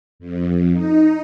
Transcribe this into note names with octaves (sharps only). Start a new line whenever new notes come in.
F2
D#4